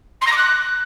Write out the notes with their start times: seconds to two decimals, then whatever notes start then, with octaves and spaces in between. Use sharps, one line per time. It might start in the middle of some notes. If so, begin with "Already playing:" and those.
0.21 C6
0.26 A#6
0.32 D6
0.37 F#6